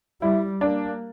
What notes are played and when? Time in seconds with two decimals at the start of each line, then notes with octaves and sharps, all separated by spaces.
0.22 G3 E4
0.61 A#3 D4